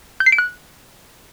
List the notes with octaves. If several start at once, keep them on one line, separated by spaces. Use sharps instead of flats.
G6
C7
D7
F#6